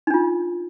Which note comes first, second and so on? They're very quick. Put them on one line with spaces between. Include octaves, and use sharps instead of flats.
D#4 D4 F4